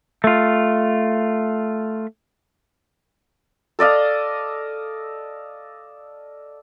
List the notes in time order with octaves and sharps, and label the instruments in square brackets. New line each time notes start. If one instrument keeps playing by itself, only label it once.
[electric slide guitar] A3 F4
[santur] A4 D5 D#5 F5